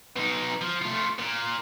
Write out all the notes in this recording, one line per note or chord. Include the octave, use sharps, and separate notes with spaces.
B2 D#4
F3
A3 F4
A#2